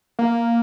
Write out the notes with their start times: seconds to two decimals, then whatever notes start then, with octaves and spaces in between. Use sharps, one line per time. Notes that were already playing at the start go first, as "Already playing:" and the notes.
0.19 A#3